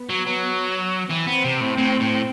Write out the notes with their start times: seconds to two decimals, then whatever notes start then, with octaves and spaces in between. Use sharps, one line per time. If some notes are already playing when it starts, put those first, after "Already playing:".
Already playing: B3
0.09 F#3
0.26 F#3
1.10 E3 C4
1.27 B3
1.44 C3
1.61 A2
1.78 A2
2.00 A2